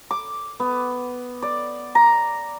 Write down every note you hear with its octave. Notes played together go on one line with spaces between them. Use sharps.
D6
B3
D5
A#5